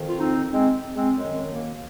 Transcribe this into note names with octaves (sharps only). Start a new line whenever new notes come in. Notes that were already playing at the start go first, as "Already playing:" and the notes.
Already playing: F2 D#3
F4
C4 D#4
G#3 C4
G#3 C4
F#2 D#3 G#3
A#3